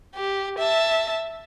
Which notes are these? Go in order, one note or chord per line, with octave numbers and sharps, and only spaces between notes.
G4
E5 A5